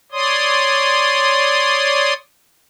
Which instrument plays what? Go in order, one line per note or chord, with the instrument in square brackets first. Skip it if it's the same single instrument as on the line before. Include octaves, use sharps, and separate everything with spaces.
[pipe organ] C#5 D5 C6 D#6